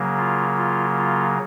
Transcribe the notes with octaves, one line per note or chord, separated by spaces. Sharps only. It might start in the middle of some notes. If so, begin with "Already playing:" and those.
Already playing: C#3 F#3 A#3
F4
F4
F4